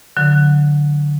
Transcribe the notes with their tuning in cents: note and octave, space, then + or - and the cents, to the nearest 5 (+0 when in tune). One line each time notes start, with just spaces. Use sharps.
D3 +0 F#3 -20